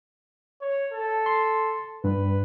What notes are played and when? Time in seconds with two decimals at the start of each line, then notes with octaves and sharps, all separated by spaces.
0.61 C#5
0.93 A4
1.26 C6
2.04 G2 B4